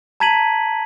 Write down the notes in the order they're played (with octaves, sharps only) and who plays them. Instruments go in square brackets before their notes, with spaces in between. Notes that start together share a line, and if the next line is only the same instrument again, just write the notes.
[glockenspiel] A5 A#5 G#6 B6 D#7 F#7